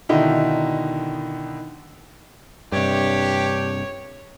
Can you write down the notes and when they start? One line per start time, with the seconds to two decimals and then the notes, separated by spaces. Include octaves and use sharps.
0.09 B2 D3 D#3 D#4 E4
2.72 G2 C3 D4 G4 C#5